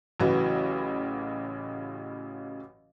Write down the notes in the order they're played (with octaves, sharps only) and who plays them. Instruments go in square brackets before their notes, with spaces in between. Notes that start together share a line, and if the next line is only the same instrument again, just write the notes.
[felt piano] A1 C#3 E3 F#3 F#4 B4